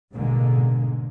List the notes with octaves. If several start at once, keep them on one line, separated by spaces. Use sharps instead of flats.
A1 G#2 B2 D3 G#3 A#3